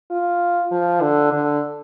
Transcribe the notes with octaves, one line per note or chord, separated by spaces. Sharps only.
F4
F3
D3
D3